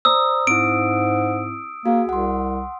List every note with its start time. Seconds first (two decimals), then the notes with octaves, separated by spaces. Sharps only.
0.05 C5 D5 A#5 D#6 E6
0.47 G#2 C4 E4 D7
1.86 A#3 F#4 G#4
2.09 C2 F#5 C6